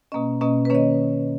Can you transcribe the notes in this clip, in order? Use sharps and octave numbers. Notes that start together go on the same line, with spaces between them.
B2 A#3 C#4 D#5
B2 A#3 C#4 D#5
B4
D#3 A#3 C#4 C#5 D#5